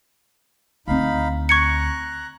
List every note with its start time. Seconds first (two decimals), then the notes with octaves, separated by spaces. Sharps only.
0.88 D2 C4 D#4 F5 B5
1.49 A#5 C#6 F#6 G#6 C#7